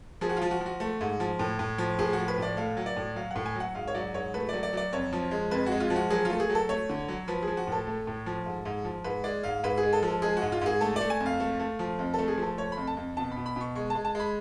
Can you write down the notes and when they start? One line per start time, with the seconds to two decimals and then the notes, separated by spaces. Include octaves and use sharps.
0.21 F3 G#4
0.29 F#4
0.37 F3 F4
0.51 F#4
0.61 F3
0.66 F#4
0.80 A3
1.01 G#2
1.20 F3
1.39 A2
1.59 A2
1.78 F3
1.99 A2 G#4
2.13 F3 F#4
2.28 B4
2.38 A2 D5
2.57 A3 F5
2.77 F#3
2.86 D5
2.96 A2
3.16 F#3 F5
3.31 A2 F#5
3.46 G#5
3.55 F#3 F#5
3.75 G#2 F5
3.87 C#5
3.94 F#3 D5
4.14 G#2 C#5
4.34 A3 B4
4.49 F#3 D5
4.63 D5
4.73 F#3 D5
4.93 F2 C#5
5.13 F3
5.31 G#3
5.51 F2 B4
5.66 F#4
5.72 G#3
5.80 F4
5.90 F3
5.96 F#4
6.10 F#3 G#4
6.25 A3 F4
6.40 G#4
6.50 F#3
6.55 A4
6.69 A3 C#5
6.89 D3
7.08 F#3
7.28 F3 B4
7.43 G#4
7.48 F3
7.57 F#4
7.67 A2 A4
7.87 A3
8.07 A2
8.26 F3
8.46 G#2
8.65 G#2
8.85 F3
9.04 G#2 B4
9.24 G#3 D5
9.43 G#2 F5
9.64 G#2 B4
9.78 G#4
9.83 G#3
9.93 A4
10.02 F3
10.08 A4
10.22 G#3 G#4
10.37 F#4
10.42 G#2
10.52 F4
10.62 G#2 G#4
10.81 A3 A4
10.96 A3 D5
11.10 G#5
11.20 F2
11.26 F5
11.40 A3
11.60 A3
11.79 F3
11.99 F2
12.14 A3 A4
12.28 G#4
12.38 F3
12.43 A4
12.58 A3 C#5
12.72 B5
12.77 F2
12.87 A5
12.97 F2
13.17 B2 A5
13.31 B2 B5
13.46 B5
13.56 B2 C#6
13.75 G#3 C#6
13.90 G#3 A5
14.05 A5
14.15 G#3 B5